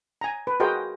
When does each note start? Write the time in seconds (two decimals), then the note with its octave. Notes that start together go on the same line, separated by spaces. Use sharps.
0.21 G#5 A#5
0.47 B4
0.60 F#4 G#4 A#4 C5 D#5 G5